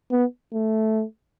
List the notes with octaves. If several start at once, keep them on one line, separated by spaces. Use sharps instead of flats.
B3
A3